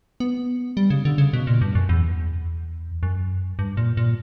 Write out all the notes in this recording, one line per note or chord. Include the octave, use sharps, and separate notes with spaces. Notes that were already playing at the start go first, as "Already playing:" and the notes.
B3
G3
C#3
D3
C#3
B2
A#2
G2
F#2
E2
F#2
G2
A#2
A#2